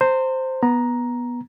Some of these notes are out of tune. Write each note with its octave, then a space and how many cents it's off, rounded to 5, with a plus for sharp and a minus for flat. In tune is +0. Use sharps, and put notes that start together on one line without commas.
C5 +0 A#5 -35
B3 -15 A#5 +10